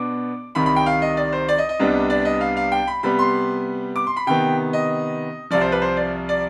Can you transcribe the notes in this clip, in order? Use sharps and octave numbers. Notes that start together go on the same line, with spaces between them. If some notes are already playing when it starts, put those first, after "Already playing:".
Already playing: B2 B3 D4 D6
C2 C3 D#3 B5
B5
G5
F5
D#5
D5
C5
D5
D#5
D#5
C2 C3 G3 B3 D4
D5
D#5
F5
F5
G5
B5
C3 G3 B3 B5
C6
D6
C6
B5
C3 D#3 B3 G5
D#5
C2 C3 F3 D5
C5
B4
C5
D5
D5